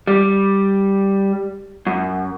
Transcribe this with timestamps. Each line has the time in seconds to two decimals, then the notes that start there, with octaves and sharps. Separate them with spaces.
0.07 G3
1.87 F#2